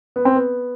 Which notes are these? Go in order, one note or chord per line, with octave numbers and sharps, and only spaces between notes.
B3
C4
B3